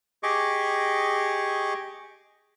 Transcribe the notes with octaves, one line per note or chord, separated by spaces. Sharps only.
G4 G#4 D#5 C#6 D6